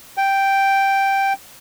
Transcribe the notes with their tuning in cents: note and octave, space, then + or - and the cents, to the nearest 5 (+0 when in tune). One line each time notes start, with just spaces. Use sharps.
G5 +0